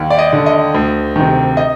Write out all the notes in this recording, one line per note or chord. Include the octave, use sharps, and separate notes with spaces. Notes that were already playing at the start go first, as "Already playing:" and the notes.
Already playing: D#2
D5
D#5
D3
D#5
D2
C3 D#3
D#5